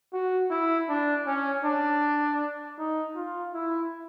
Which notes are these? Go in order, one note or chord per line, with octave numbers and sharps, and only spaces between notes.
F#4
E4
D4
C#4
D4
D#4
F4
E4